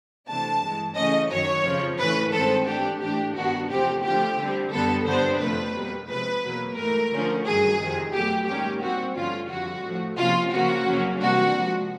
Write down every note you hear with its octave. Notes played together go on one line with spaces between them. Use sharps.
C3 E3 A3 D4 A5
G2 E3 G#3
C#3 E3 A3 C#4 D#5
F#2 D#3 F#3 C#5
F2 C#3 F3
A2 E3 A3 C#4 B4
G2 D#3 G#3 C4 A4
G#2 E3 A3 D4 G4
A2 E3 A3 D4 G4
G2 D#3 G3 B3 D4 F#4
E2 C3 F3 A3 C4 G4
D3 F3 A3 G4
D3 G3 C4
F#2 D3 G3 B3 A4
G2 D3 G3 B3 D4 C5
F2 C3 F3 A3 B4
B2 G3 A#3
C3 F3 G#3 B4
E2 B2 F#3 A#3
G#2 E3 A3 A#4
D3 F3 A3 C#4
G2 D#3 F#3 G#4
F2 C3 D#3
B2 F#3 A3 G4
G#2 D#3 G3 A#3 C#4 G4
A#2 G3 C4 F#4
G2 D3 F3 A3 C#4 F4
F2 D3 G3 F#4
A2 F3 A3
C3 F3 A#3 C#4 F4
C#3 F3 A#3 C#4 F#4
F2 C#3 F#3 A#3 C#4
C3 E3 G3 A#3 D4 F#4
C3 F3 G#3